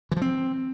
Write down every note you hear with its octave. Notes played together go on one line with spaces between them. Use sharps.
E3
F3
C4